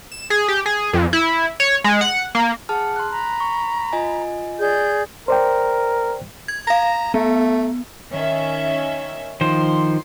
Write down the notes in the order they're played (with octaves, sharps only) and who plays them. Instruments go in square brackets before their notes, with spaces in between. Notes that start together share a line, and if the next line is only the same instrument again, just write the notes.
[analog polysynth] E7
G#4
G4
G#4
F2
E4
C#5
G#3
F#5
A#3
[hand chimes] G#4 A5 F6 [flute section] F#5
[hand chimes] C6 F#6
[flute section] A#5 B5
[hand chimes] C#6
F4 D#5 G#5
[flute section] G#4 D5 G6
[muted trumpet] A#4 [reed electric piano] C5 D5 G5
[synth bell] G#6
[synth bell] F5 A#6 [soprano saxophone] A#5
[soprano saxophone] A3 [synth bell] B3
[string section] D#3 C#4 E5
[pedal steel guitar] D#3 F3 C5 [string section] C6